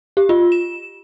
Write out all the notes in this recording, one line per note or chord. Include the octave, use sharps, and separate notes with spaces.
G4
F4
E7